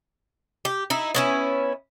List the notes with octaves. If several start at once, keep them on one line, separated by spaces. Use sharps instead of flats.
G4
D#4 E4
B3 C#4 E4